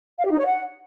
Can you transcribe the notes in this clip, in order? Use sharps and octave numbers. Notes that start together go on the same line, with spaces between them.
F5
G4
D#4
C#5
F#5